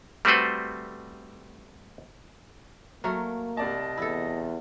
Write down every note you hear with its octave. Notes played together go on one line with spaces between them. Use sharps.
G3 A3 C4 F#4 B4 C5
F#3 A3 A#3 A#4
C2 D5 D#5 A5
E2 E4 A4